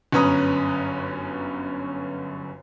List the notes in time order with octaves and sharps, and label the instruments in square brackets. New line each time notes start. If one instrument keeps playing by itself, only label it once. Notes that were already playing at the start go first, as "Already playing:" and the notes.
[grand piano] G1 F#2 C#4 B4 A#5 D#6